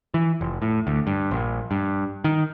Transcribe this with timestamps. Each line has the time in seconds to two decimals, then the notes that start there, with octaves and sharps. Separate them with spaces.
0.14 E3
0.41 F1
0.62 A2
0.87 D2
1.07 G2
1.31 A#1
1.71 G2
2.24 D#3